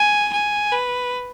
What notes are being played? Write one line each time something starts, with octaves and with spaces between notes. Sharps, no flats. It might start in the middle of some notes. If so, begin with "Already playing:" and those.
Already playing: G#5
G#5
B4